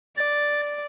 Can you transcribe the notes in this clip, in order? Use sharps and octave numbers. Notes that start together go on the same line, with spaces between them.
D5 A6